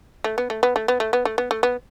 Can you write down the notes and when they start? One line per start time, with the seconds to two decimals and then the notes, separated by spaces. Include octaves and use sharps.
0.24 A3
0.38 B3
0.50 A3
0.63 B3
0.76 A3
0.88 B3
1.00 A3
1.13 B3
1.25 A3
1.38 B3
1.51 A3
1.63 B3